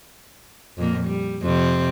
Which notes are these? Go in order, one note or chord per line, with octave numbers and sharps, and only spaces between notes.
F2 A#2 A#3
G3
F2 C3 C4